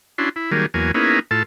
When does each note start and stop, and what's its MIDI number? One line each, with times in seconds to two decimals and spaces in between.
0.18 0.29 61
0.18 0.29 62
0.18 0.29 64
0.18 0.29 66
0.18 0.29 84
0.36 0.51 64
0.51 0.66 51
0.51 0.66 54
0.51 0.66 55
0.51 0.66 58
0.51 0.66 68
0.74 0.92 40
0.74 0.92 54
0.74 0.92 58
0.74 0.92 80
0.94 1.19 58
0.94 1.19 59
0.94 1.19 61
0.94 1.19 63
0.94 1.19 64
0.94 1.19 68
1.31 1.43 45
1.31 1.43 65
1.31 1.43 69
1.31 1.43 81